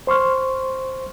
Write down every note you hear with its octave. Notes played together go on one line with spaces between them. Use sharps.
C5 C6 C#6 F6